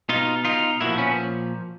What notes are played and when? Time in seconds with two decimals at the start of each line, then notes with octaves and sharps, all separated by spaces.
0.09 B2 D#4 F4
0.45 D#4 F4
0.81 A#2 F3 E4 F#4
0.98 B3 C#4